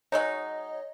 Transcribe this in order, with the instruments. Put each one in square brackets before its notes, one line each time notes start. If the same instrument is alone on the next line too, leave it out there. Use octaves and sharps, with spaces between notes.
[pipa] F#3 G#3 D#4 [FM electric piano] C#5 D#5